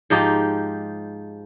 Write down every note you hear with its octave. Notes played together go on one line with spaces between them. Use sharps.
G#2 F3 D#4 G4